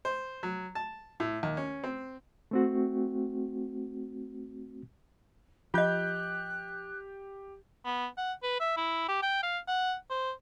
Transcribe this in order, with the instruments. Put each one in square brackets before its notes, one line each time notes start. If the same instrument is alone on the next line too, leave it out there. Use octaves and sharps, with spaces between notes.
[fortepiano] C5
F#3
A5
A2
D#2
C#4
C4
[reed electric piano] A3 C4 F#4
[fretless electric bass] F3 [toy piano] F4 D#5 [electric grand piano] G4 G6 [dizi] F#6
[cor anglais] B3
F#5
B4
E5
E4
G4
G5
F5
F#5
C5